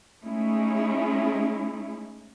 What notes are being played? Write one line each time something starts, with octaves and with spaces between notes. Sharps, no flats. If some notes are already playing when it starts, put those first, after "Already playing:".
G#3 A3 C#4 D#4 E4 G#4